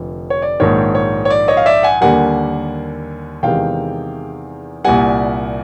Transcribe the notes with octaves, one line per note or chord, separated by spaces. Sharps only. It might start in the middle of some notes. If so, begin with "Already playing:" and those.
Already playing: F1 D3 F3
C#5
D5
A#1 G#2 D#3 C#5
C#5
C#5
D5
C#5 D#5
F5
D5 E5
F#5 G#5
D#2 D3 G3 A#3 F#5 G#5
E2 C3 D#3 G#3 F5 G5
C2 A#2 G3 F#5 G#5